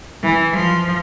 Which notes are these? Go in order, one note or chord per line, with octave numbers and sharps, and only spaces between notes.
E3
F3